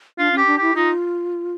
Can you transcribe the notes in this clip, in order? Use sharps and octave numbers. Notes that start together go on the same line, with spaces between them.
D4 F4
C#4
G4
D4
E4 G4
D#4 F4